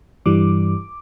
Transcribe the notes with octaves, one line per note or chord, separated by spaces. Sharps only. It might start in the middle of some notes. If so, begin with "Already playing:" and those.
G2 E3 G3 D6